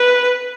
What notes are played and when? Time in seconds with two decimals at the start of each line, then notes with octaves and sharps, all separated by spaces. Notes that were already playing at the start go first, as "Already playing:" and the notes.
Already playing: B4